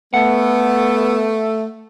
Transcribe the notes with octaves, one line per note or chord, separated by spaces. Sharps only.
A3 B3 F#5